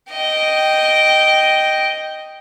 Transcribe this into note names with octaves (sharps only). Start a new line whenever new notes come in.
D#5 G5